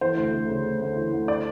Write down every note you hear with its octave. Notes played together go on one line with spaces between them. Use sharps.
E3 C5
D2
D2
C#3
D2
D2
E3
D2
D5